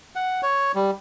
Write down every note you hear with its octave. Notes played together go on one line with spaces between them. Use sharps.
F#5
C#5
G3